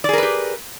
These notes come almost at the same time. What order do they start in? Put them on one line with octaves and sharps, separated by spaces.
D5 G#4 A#4 B4 G4